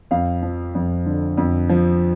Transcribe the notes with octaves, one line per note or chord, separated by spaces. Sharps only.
F2 F5
F3
F2
D3
F2
F3